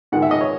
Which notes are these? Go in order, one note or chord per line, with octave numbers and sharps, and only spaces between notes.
G#2 D#3 G#3 F#5
E5
D#5
C#5